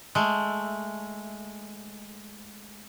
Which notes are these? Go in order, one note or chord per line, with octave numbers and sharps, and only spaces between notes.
G#3 A3